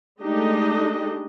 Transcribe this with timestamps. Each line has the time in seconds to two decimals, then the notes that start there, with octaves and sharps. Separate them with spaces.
0.22 G#3 A3 D4 D#4 G4 D#5